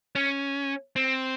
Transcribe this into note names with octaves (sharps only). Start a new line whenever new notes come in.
C#4
C4